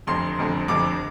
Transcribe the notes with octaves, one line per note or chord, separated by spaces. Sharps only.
F1 F2 D3 C6
F1 F2 D3
F1 F2 D3 D6